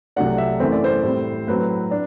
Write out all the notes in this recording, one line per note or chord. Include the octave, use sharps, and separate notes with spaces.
C2 C3 F#3 A3 D4 F#5
E5
F#2 E3 A3 C4 C5
D5
C5
A2 G3 C4
A2 F#3 C4 B4
D4